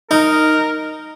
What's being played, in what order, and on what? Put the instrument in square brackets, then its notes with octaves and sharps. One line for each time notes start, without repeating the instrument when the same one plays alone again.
[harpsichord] D#4 [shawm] A#4